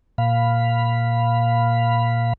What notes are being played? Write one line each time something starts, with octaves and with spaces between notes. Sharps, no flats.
A#2 F5 B5